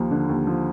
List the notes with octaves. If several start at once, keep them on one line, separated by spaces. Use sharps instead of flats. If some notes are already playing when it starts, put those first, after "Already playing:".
Already playing: D#2 F3
D3
D#2
F3